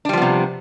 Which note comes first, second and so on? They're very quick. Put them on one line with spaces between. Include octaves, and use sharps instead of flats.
D4 G3 F3 B3 C3